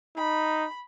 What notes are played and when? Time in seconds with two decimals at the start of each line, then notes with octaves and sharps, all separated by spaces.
0.17 D#4 B5